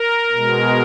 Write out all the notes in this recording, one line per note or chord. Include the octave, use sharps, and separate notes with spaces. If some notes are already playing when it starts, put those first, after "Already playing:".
Already playing: A#4
B2 G#3